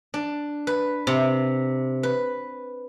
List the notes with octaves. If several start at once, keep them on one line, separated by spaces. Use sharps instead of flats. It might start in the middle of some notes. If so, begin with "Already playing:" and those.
D4
B4
C3
B4